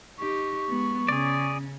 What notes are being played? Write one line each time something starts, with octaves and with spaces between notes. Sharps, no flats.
D#4 G4 C#6
G#3 B3
C#3 C#4 G#4 D5